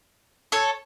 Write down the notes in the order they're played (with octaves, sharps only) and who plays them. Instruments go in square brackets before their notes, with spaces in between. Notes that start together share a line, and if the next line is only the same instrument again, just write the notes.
[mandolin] A4 C#5